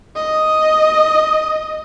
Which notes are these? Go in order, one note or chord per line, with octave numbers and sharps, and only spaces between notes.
D#5